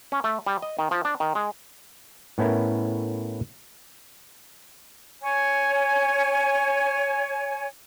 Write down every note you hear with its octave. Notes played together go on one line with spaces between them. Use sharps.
C#4
A3
G3
D#5
D#3
F3
D4
D#3
G#3
A2 B3 C#4 E4 A#4
C#5 G#5